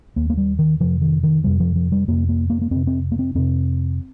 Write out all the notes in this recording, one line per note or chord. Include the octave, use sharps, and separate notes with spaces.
D#2 A#3
A#3
G3
D#3
F2 C3 F3
D#3
D#3
F2 C3 G3
F3
F3
G3
F2 C3 A#3
A#3
A#3
A#3
F2 C3 C4
C4
A#3
C4
F2 C3 C4